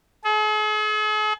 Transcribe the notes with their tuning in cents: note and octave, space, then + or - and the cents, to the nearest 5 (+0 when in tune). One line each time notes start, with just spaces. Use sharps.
G#4 +45